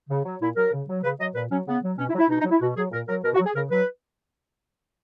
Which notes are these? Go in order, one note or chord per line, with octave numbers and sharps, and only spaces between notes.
C#3
F#3
A#2 E4
F#3 A#4
C#3
F#3
C#3 B4
F#3 D#5
A#2 B4
F#3 C#4
C#3 B3
F#3
B2 C#4
E4
F#3
E4
B2 D#4
D#4
F#3
E4
B2 F#4
F#3 G#4
A#2 A#4
F#3 A#4
B2 A#4
F#4
F#3
G#4
C#3 A#4
F#3 B4